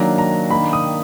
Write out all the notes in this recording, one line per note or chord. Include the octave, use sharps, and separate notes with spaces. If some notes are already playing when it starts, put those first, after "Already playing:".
Already playing: D#3 F#3 A#3 D4 A#5
A#5
D#3 A#3 D4 B5
D#6